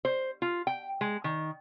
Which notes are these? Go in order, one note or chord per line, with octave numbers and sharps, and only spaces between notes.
C5
F4
G5
G#3
D#3